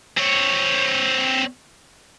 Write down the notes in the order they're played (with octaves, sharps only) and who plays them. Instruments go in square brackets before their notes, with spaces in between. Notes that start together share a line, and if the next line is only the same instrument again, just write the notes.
[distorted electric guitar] C4 C#5